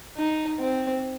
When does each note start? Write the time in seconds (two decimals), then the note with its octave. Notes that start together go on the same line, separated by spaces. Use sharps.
0.17 D#4
0.59 C4